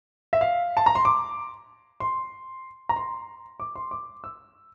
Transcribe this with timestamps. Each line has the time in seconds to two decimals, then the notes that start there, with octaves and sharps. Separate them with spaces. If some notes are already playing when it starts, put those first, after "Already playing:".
0.33 E5
0.41 F5
0.77 A5
0.86 A#5
0.95 C6
1.05 D6
2.00 C6
2.89 A#5
2.96 C6
3.60 D6
3.76 C6
3.91 D6
4.24 E6